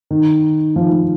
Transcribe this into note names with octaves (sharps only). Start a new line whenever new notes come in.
D#3
F3
F3